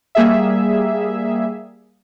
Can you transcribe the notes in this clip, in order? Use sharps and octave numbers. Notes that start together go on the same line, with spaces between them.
G3 A#3 G#4 E5